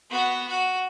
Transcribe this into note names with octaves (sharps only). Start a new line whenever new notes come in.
B3 F#4
F#4